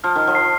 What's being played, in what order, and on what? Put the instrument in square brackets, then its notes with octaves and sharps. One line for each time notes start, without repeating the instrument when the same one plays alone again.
[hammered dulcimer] F3 [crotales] F6
[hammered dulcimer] D#3 [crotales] F6
[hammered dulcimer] F3
[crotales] C7